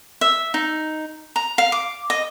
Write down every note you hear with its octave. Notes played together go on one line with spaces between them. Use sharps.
E5
D#4
A#5
F5
D6
D#5